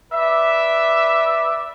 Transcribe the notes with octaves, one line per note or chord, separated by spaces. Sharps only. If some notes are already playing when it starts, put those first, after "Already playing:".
B4 D5 E5